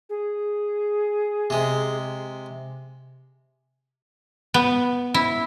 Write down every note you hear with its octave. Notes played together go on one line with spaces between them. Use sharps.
G#4
C3 G#3
B3
E4